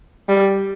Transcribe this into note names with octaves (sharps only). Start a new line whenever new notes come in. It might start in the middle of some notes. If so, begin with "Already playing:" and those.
G3